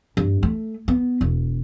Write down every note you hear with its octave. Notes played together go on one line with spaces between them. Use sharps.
G2
A3
B3
E1